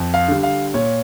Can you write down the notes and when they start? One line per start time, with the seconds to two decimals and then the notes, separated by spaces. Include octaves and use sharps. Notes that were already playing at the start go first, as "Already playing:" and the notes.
Already playing: F2
0.14 F5
0.28 D3 G3
0.43 F5
0.74 A#2 C#5